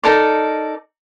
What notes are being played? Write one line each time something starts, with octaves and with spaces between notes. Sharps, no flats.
D#4 A4 A#4 D5